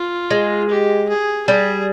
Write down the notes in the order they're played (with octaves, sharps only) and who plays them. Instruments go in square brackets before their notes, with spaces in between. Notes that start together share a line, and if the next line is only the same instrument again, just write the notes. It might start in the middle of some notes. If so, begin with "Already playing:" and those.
Already playing: [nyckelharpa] F4
[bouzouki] G#3
[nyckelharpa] G4
G#4
[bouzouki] G3 [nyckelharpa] G#4